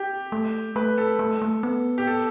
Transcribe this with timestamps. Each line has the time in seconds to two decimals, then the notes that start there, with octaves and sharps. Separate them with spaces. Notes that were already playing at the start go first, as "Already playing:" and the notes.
Already playing: G4
0.32 A3
0.76 A3 B4
0.98 A4
1.19 A3
1.42 A3
1.63 B3
1.98 G4
2.07 A4